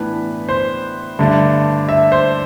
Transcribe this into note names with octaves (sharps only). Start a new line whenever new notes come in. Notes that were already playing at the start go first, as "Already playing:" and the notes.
Already playing: A2 E3 B3 D4 B4
C5
G2 D3 A3 D4
E5
C5